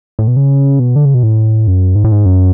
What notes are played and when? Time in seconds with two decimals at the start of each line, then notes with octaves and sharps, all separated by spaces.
0.19 A2
0.27 B2
0.37 C#3
0.79 B2
0.96 D3
1.05 C#3
1.14 B2
1.23 A2
1.68 F#2
1.96 G#2
2.04 A2
2.12 G#2
2.25 F#2